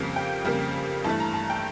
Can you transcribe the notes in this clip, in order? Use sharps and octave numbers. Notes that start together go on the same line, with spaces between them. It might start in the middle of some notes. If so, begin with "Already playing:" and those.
Already playing: F2 C#3 G3 A#3 F5
G5
F2 C#3 G3 A#3
G2 E3 A3 A5
A#5
A5
G5